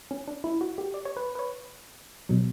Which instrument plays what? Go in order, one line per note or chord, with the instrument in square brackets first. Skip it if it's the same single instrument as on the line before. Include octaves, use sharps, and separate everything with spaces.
[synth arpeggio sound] C#4
D4
E4
F#4
G4
D5
C#5
B4
B4
C#5
B2 F#3